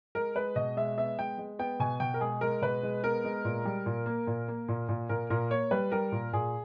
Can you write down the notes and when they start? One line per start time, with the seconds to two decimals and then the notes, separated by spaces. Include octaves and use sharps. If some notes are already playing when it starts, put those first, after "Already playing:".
0.15 G#3 A#4
0.35 G#3 B4
0.56 B2 D#5
0.77 G#3 E5
0.98 B3 E5
1.19 G#3 G5
1.38 G#3
1.59 B3 G5
1.80 B2 G#5
2.00 B2 G5
2.14 A#4
2.21 G#3 G#4
2.41 G#3 A#4
2.62 B2 B4
2.83 G#3
3.04 B3 A#4
3.25 G#3
3.45 A#2
3.65 G3
3.86 A#2
4.06 A#3
4.27 A#2
4.48 A#3
4.68 A#2
4.89 A#2
5.09 A#2 A#4
5.30 A#2 A#4
5.50 A#3 C#5
5.71 G3 B4
5.92 G3 A#4
6.12 A#2
6.33 A#2 G#4